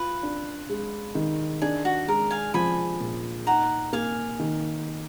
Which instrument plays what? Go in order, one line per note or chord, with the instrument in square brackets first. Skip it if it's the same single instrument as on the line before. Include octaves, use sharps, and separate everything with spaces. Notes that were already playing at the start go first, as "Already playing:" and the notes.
Already playing: [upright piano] F4 [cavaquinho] B4
[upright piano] D4
G#3
D#3
[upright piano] D4 [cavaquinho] G#4
[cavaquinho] F#4
[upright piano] G#3 [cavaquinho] A#4
[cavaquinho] F5 G#5
[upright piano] F3 [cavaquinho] G#5 B5
[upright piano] A#2
[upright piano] D#4 [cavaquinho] F#5 A#5
[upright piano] A#3 [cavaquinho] F5 G#5
[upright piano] D#3